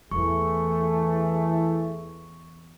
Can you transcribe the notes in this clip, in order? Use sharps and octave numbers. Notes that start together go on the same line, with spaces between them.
E2 E3 A3 G#4 C#6